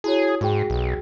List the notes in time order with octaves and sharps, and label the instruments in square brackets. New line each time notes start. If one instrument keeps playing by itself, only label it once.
[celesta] E4 F#4 C#5 [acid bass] G#4
[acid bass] G#2 [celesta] F#4 G#4 G5
[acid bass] B1